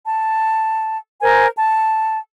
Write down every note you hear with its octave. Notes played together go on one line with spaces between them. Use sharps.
A5
A#4 C5 G#5
A5